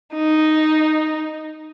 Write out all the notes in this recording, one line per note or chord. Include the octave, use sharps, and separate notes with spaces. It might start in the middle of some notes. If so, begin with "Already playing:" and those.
D#4